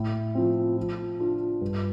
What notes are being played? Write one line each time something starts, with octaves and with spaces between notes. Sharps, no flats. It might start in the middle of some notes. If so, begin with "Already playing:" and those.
Already playing: A2
F3 C4
F3
D4 F4
G2